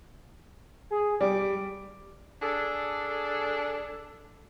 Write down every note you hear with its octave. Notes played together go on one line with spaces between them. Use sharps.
G#4
G3 D6
D4 G#4 A4